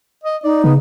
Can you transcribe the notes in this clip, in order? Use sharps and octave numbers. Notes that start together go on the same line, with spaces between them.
D#5
D#4 D5
C#3 B3